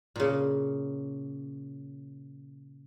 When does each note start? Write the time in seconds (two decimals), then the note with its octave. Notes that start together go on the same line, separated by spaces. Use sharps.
0.16 A#2 C#3